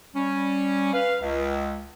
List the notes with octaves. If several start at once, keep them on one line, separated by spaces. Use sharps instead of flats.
G3 C#4
B4 F5
C#2